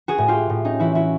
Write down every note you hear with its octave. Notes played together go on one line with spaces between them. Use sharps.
F#4 G#4
A2
F4 G4
A2
C#4 D#4
E3 E4 F#4
E4 F#4